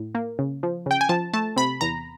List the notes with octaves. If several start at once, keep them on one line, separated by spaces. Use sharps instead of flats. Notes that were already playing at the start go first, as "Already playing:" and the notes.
Already playing: A2
A#3
C#3
F3
C#3 G5
G#5
F3 A5
A3 A5
C3 B5
E2 A#5